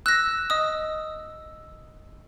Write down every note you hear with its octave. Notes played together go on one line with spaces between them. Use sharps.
E6 F#6 A#6
D#5 D#6